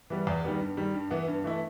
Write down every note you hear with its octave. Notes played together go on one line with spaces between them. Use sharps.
E3 G3 B3
E2
D#3 G3 B3
G2
D#3 G3
G2
E3 B3
G2
E3 A3 E4